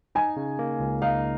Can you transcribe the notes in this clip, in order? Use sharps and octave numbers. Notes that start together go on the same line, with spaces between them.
D#4 G#5
C#3
A#3
C#2
D#4 F5